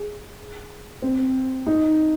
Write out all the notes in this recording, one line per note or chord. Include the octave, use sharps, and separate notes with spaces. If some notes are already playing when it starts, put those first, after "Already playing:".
Already playing: G#4
C4
D#4